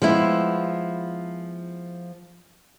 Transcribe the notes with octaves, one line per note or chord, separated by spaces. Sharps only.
F3 G#3 B3 E4